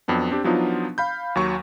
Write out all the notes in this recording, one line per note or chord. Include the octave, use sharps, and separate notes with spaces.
F2 F#3 B3 D4
C4 D4 G4
F3 F#3 B3 D4 D#4 F4
F5 B5 G6
D#2 F#3 C#6